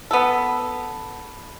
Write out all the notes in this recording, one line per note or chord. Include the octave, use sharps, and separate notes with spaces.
B3 A4